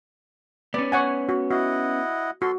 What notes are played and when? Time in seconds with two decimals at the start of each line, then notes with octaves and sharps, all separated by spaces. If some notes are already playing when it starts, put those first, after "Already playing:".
0.74 B3 C#4 D5
0.92 C#5 F#5 G#5
1.29 F#4
1.51 E4 F#4 D#5 F#5
2.42 F#4 A4 C6